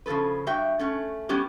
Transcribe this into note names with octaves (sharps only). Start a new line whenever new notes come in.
C#3 F3 B3 A4 B4
G2 F#4 E5 G5
A3 C#4 F#5
G3 B3 C#4 F#4 G4